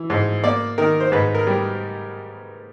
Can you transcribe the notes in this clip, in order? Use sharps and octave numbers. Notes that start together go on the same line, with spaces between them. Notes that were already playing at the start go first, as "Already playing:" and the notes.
Already playing: E3
G#2
A#3 D5
D#3 A#4
C5
G#2 B4
A#4
G3